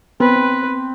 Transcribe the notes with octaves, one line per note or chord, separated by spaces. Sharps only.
B3 C4 B4